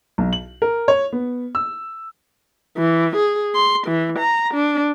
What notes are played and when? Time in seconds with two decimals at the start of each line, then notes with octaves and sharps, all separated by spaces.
0.18 B1
0.33 F#7
0.62 A#4
0.88 C#5
1.13 B3
1.55 E6
2.78 E3
3.16 G#4
3.55 C6
3.87 E3
4.19 A#5
4.54 D4